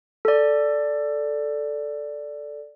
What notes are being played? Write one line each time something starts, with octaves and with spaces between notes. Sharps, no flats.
A4 D5